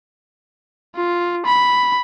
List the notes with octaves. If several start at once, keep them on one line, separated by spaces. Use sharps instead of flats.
F4
B5